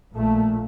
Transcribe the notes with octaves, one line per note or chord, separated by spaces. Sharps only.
A#1 A#2 A3